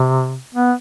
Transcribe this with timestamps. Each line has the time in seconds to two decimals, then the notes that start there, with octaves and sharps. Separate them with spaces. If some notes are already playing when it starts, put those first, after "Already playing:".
Already playing: C3
0.54 B3